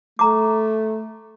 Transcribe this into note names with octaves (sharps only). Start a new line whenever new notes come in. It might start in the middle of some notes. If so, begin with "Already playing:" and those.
A3 A#5 D6